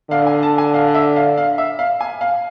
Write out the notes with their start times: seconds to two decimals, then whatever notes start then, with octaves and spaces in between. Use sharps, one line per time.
0.10 D3 F5
0.26 G#5
0.43 A5
0.58 G#5
0.74 F5
0.94 E5
1.16 F5
1.38 F5
1.58 E5
1.79 F5
2.01 G#5
2.21 F5